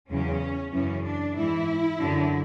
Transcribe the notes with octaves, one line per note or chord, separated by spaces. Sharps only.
E2 C#3 F#3 C#4
F#2 C#3 E3 C#4
D4
G#2 E3 E4
F#2 D3 F#3